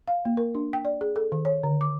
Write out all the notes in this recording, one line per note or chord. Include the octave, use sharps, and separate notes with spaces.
F5
A#3
A#4
D4
G5
D5
G#4
A4
D#3
C#5
D3
D6